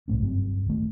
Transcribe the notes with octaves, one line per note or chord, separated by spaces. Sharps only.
C2 A2 A3 C#4
F#1 G2 F#3 C4
D1 D#3 A3